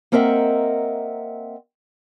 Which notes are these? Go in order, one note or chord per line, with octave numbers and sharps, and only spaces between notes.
A#3 C4 A#4 D#5 E5 F#5